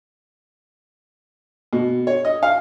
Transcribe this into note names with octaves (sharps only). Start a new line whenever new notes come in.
B2
C#5
D#5
F5